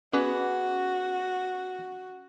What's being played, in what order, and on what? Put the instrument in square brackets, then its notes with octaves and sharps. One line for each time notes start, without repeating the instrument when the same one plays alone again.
[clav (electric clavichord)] B3 G#4 B4 [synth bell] C#4 [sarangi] F#4